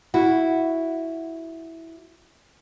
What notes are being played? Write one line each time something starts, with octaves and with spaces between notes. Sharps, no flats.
E4 F#4